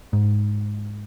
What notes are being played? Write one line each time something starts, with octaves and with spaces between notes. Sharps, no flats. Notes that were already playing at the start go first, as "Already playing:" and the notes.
G#2